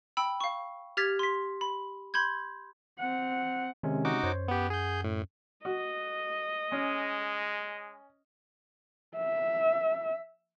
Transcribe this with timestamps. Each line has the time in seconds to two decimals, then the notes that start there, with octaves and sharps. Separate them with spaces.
0.17 G5 B5 E6
0.40 F5 C#6
0.97 G4 F6 G#6 A6 B6
1.19 C6 B6
1.61 B5
2.14 B5 C6 G6 G#6
2.99 C4 F#5
3.83 C3 D#3 G#3 C#4
4.05 D#4 F#4 D6
4.23 F#2 C5 C#5
4.48 B3 G4 F#5
4.70 G#4 G6
5.04 A2
5.65 F#4 D#5
6.72 G#3 C#4
9.17 E5